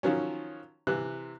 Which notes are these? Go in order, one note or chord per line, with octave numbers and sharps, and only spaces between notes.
D#3 F3 F#3 C#4
C3 E3 F#6